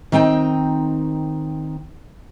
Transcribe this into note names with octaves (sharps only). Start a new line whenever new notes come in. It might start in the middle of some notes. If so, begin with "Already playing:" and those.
D#3 C4 D#4 G5